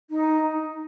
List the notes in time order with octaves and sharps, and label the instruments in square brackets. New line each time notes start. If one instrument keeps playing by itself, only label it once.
[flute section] D#4